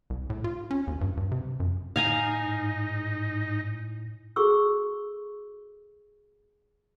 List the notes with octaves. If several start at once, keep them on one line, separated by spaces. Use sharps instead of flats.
C2
A2
F4
C#4
D#2
G2
G2
C3
F#2
A2 D#4 F5 G#5 A#5
G#2
F#4 G#4 A4 C#6 E6